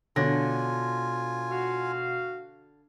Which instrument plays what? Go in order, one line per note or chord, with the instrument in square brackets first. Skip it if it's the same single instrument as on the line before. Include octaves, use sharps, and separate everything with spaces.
[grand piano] B2 C#5 A#6 [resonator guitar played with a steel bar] D3 [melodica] F4 G#5
[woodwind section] F#4 F5